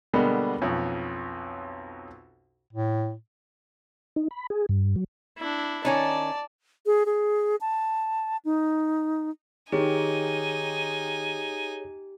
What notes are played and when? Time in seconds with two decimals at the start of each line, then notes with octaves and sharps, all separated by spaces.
0.13 B2 D3 G3 G#3 A#3 B3
0.61 B1 F2 C#4
2.73 A2
4.16 D#4
4.31 B5
4.50 G#4
4.69 G2
4.96 F#3
5.38 D4 E4
5.85 D#3 C#4 D#4 D5 A5
6.86 G#4
7.06 G#4
7.61 A5
8.45 D#4
9.72 D#3 D#4 G4 G#4 C#5 G#5